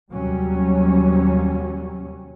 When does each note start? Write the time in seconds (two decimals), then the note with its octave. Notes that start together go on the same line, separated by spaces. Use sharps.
0.11 D#2 C3 F#3 G3 C#4